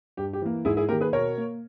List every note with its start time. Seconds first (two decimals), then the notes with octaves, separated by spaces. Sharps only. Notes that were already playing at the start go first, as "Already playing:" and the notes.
0.17 G2 G4
0.33 G4
0.42 E3 A#3
0.65 G#2 E4 G#4
0.77 E4 G#4
0.89 D#3 A#3 G4 A#4
1.01 G#4 B4
1.13 B2 A#4 C#5
1.37 A#3